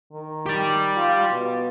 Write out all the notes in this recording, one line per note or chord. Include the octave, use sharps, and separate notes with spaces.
D#3
G4 D5
F4
B2